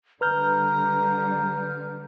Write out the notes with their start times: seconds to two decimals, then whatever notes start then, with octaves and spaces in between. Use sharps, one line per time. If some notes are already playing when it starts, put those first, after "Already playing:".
0.21 D3 G3 B4 A#5 F6 G6